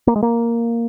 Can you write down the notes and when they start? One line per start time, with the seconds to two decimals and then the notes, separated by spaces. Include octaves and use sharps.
0.07 A#3
0.16 G#3
0.23 A#3